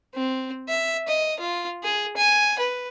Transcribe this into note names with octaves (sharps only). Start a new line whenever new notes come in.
C4
E5
D#5
F4
G#4
G#5
B4